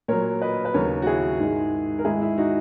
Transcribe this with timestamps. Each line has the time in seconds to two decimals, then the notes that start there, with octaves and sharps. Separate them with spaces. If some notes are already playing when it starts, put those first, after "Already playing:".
0.08 A#2 F#3 A#4 C#5
0.41 B4 D#5
0.65 B4
0.74 D#2 C#3 F#3 A#4 C#5
1.02 F#4
1.07 E4 G#4
1.39 G#2 D#3 G#3
1.99 A#4
2.05 G#2 D#3 G#3 E4 G#4
2.21 E4
2.37 D#4 F#4